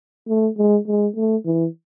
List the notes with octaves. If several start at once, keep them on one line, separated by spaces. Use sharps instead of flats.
A3
G#3
G#3
A3
E3